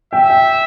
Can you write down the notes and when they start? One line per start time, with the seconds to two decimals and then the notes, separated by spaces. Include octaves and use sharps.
0.13 E5 G5
0.30 G5